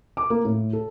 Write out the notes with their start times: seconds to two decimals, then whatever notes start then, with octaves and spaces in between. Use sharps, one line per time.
0.17 D6
0.30 A#3
0.45 A2
0.73 A4